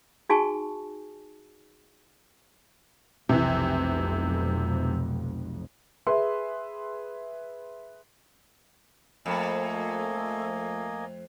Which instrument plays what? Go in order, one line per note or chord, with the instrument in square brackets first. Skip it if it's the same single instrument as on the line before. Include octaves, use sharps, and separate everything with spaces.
[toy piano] D#4 F#4 G#4 G#5 A5 C#6
[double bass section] F1 B1 F2 [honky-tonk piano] C3 E3
[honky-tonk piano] G#4 B4 E5 C6
[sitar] F2 [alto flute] A3 [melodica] A#3 D#5 G#5